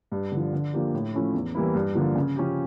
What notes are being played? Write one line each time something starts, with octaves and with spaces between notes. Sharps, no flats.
G2
D3 F3
D3
F3 A#3 D4 G4
A2
F3 A3 C#4 E4
E2
E3 G3 A#3 E4
G2
D3 F3 A#3
C#3
F3 C#4 G4